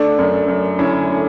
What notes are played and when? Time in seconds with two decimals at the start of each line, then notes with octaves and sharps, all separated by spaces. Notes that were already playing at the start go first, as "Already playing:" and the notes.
Already playing: A3 D4
0.19 F#2
0.48 F#2
0.79 D3 C#4 E4
1.08 A3